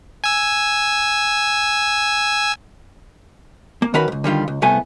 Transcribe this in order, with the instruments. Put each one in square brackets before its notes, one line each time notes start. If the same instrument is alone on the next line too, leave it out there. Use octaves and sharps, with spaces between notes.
[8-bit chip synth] G#5 E6
[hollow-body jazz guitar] A#3
D#3 C#4 F#4 A#4 B4 B5
C#2 G#2
D3 D#3 G3 F4
C#2
C2 A2 A3 B3 G#5